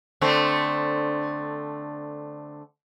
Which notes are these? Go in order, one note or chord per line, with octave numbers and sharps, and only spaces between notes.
D3 A3 C4